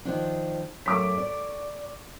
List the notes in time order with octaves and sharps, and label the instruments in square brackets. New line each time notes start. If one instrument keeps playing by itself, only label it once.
[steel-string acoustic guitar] D#3 F3 D4
[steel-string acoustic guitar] F#2 A3 [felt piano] C#6 D6 B6
[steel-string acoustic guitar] D5